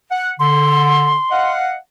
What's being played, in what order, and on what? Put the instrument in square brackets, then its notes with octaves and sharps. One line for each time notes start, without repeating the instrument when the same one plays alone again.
[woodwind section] F#5
[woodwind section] D3 [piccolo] C6
[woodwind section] D#5 F5 F#5